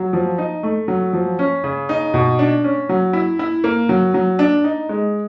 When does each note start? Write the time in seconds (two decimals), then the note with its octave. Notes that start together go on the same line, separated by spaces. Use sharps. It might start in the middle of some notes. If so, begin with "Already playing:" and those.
Already playing: F#3
0.13 F3
0.38 D#4
0.63 A3
0.88 F#3
1.13 F3
1.39 C#4
1.64 C#3
1.89 D#4
2.14 B2
2.39 D4
2.64 C#4
2.89 F#3
3.13 E4
3.39 E4
3.64 A#3
3.89 F#3
4.14 F#3
4.39 D4
4.64 D#4
4.89 G#3